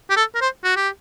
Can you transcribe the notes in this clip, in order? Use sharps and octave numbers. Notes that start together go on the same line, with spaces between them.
G4
A4
A#4
C5
F#4
G4